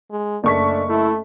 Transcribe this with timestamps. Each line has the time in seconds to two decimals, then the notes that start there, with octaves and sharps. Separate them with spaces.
0.11 G#3
0.44 F#1 A3 D4 C#6 B6
0.89 A3 E4